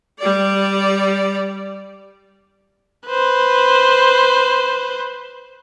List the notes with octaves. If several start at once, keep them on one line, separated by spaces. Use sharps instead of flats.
G3 D5
B4 C5